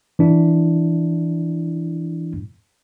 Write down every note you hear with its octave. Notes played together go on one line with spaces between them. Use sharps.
E3 D4 E4